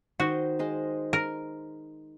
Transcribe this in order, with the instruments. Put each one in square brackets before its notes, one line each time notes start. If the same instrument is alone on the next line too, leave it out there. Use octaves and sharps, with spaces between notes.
[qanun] D#3 C5 D#5 [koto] F#4
[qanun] G#3 C5 D#5
[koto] A#4